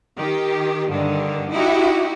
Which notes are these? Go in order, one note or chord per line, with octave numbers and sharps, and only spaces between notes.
D#3 G4
G2 D3 D#3
D#4 E4 F#4 G4